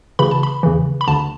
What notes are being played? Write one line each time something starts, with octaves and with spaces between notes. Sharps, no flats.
D2 C#3 E3 B5
A5
B5
E2 C#3 E3
B5
D2 D3 A5